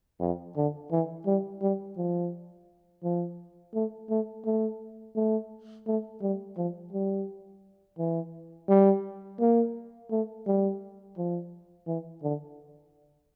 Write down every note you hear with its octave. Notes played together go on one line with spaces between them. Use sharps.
F2
D3
E3
G3
G3
F3
F3
A3
A3
A3
A3
A3
G3
F3
G3
E3
G3
A#3
A3
G3
F3
E3
D3